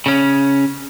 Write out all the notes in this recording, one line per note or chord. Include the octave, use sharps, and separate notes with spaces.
C#3 C#4